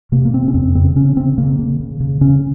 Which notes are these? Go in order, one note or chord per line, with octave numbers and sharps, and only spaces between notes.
C3 A#3
A#3
C3 C4
C#4
F2 C4
C#3 C4
C#3 C#4
C#4
C#3 C4
C#3 A#3
C#3
C#3
C#3
C#3 C#4